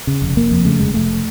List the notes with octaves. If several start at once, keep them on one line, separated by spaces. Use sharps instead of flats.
C#3
F1
F1 A#3
F2
C#3 A3
F1 G#3
F1 A3